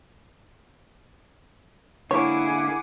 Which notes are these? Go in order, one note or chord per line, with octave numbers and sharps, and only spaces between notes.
D3 A#3 E4 G#4 C#5 F#5 D6